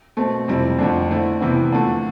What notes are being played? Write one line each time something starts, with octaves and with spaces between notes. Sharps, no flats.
B2 A3 C4
F2 C3 G3 C4 E4
F2 D3 A3 D4
D3 A3 C4 E4
E2 C3 E3 B3 E4
D3 F3 A3